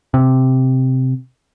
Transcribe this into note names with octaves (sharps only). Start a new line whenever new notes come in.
C3